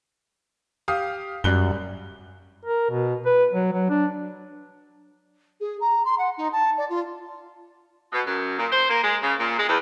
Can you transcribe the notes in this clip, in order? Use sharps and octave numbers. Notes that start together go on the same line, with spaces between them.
G4 F5 D#6
F#2 G3 F#6 G7
A#4
B2
B4
F#3
F#3
D4
G#4
A#5
C6
F#5
D#4
A5
D5
F4
B2
F#2
A#2
C5
A#3
G#3
C#3
A#2
G#3
E2